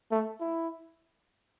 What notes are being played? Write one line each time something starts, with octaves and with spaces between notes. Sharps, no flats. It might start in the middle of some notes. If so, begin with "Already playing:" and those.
A3
E4